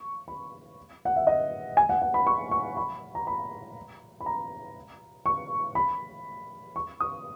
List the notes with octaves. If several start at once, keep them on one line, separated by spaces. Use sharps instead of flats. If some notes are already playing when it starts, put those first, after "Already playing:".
Already playing: C#6
B5
F#5
E5
D#5
G#5
F#5
F#5
B5
C#6
C#6
B5
A#5
B5
B5
A#5
C#6
B5
C#6
D#6